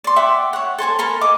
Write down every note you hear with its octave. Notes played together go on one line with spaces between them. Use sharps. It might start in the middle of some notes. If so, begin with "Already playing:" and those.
D5 C6
E5 F#5 G5 D6
C#5 F#5
A4 C5 G#5 A5
A4 A#4 A#5 B5
G#4 D#5 D6